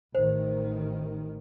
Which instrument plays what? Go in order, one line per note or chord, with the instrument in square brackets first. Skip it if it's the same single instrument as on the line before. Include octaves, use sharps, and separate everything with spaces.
[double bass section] A1 D#3 [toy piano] C5